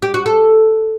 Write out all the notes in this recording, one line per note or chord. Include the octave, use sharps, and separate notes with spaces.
G4
F#4
A4